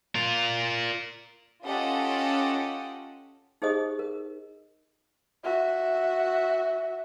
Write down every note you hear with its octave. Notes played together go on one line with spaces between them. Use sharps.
F4 A#4
C#4 F4 G4 A4 D#5 F#5
D#4 G4 G#4 C5 D#5 D#6
A#4
F#4 E5